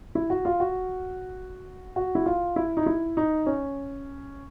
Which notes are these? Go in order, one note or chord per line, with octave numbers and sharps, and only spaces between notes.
E4
F#4
F4
F#4
F#4
E4
F4
E4
D#4
E4
D#4
C#4